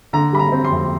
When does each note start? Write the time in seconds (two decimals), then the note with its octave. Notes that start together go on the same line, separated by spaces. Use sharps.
0.13 D3 A#5
0.33 G3 B5
0.39 A#5
0.52 C4
0.64 C6
0.71 F2